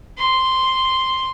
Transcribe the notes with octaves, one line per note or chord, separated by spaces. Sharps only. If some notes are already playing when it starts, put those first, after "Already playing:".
C6